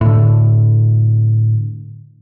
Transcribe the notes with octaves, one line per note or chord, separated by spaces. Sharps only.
A2 D3